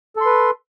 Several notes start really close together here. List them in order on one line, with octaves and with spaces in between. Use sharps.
A4 C6 B4